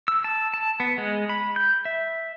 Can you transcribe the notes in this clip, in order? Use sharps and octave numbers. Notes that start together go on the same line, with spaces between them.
E6
A5
A5
B3
G#3
B5
G6
E5